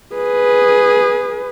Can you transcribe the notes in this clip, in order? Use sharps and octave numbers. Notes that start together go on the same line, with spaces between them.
G#4 B4